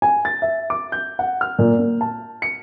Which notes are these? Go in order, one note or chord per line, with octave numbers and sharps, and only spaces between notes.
G#5
A6
E5
D6
G6
F#5
F6
A#2
A#3
A5
C#7